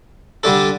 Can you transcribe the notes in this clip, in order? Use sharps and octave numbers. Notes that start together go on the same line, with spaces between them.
D3 G3 D4 A4